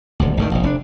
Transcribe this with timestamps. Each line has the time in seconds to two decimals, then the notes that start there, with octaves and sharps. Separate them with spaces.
0.20 D#1 D2
0.37 G#1 D2 D#3
0.51 E1 A#1
0.63 F1 C#4 D4